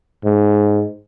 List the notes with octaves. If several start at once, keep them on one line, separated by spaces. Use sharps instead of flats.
G#2